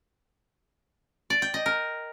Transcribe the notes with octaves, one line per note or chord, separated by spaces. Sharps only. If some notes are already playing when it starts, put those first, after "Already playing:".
D5
G5
D#5
A#4